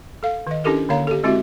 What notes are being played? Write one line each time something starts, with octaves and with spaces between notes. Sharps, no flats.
A4 F5
D#3 D#5
C#4 D4 E4 G4 A4 A#4
D3 A#3 C#5 F5 A#5
G4 A4
G#3 C4 E4 F#4 G4 E5